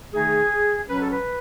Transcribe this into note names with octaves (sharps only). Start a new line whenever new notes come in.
D#3 A3 D#4 G#4
B2 F#3 C#4 B4
A4
B4